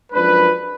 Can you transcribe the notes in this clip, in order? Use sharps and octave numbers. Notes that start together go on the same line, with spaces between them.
F#2 F3 G#3 D4 B4